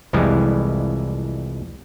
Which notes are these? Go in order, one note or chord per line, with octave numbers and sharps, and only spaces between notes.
C2 F2 E3 F3 G3 G#3